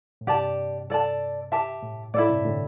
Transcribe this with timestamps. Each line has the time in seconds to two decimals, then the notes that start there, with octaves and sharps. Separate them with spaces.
0.21 A2
0.27 G2 C3 G4 D5 A5
0.90 A4 D5 A5
1.52 G4 E5 A5
1.83 A2
2.14 A2 E4 A4 D5
2.30 G2 C3
2.45 A2 D3